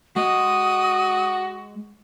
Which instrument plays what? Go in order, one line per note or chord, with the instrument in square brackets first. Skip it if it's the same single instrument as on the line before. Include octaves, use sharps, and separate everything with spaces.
[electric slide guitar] G#3 D#5 [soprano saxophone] F#4 [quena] D#6